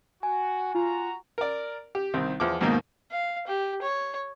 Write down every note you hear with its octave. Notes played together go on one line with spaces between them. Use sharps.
F#4 G#5
F4 F#4 A#5
A#4 D5
G4
C2 D#3 C4
E2 F3 D6
D#2 G#2 B2 D#3 A#3
F5
G4
C#5